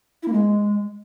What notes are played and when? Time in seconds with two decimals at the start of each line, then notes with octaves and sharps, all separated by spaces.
0.23 E4
0.28 A#3
0.33 G#3